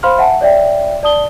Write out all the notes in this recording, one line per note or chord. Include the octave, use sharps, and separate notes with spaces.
C5 F5 B5 C6 F6
E5 F#5 G#5 A5
C#5 D5 E5 G5
D5 A5 D#6 G7